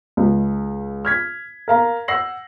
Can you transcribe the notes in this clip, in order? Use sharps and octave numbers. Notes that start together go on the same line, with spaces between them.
C#2
F6 G#6 B6
A#4 F5 A#5
F#5 E6 A#6 C7 F#7